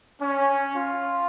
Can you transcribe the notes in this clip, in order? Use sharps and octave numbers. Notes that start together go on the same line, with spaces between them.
C#4
F4